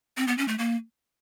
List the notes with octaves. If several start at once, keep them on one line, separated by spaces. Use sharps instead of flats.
C4
B3
C#4
A3
A#3